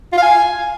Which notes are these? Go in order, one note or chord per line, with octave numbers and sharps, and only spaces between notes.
F4
F5
G#5